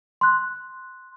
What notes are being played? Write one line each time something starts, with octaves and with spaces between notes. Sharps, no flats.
C6 F#6